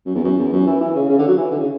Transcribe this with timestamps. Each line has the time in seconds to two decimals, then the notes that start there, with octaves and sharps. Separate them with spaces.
0.06 F#2
0.15 E2
0.24 F#2
0.38 E2
0.53 F#2
0.66 E3
0.81 E3
0.95 C#3
1.09 C#3
1.19 D3
1.28 F#3
1.37 E3
1.51 D3
1.59 C#3